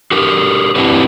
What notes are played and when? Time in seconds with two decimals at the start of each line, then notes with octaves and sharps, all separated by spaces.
0.11 F#4 G4 A#4
0.76 C4 D4 E4 F#4 G4 B4